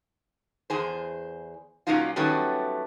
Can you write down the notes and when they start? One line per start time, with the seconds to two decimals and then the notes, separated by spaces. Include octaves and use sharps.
0.70 E2 G#4 C5
1.87 A#2 F#3 A#3 C#4 D#4 F4
2.16 D#3 F#3 G3 A3 B3 C#4